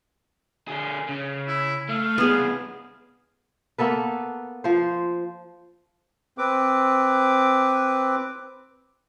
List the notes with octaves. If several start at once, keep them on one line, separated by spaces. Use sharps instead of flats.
D3 G#4
C#3
E4
A3 F5
G2 C3 B3 G#4
A#3 B3 A4 B4
F3 C5
C4 B4 D6